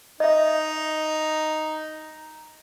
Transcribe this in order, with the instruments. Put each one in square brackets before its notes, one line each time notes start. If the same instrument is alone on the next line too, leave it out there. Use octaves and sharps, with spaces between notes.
[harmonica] D#4 [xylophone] D#5 E5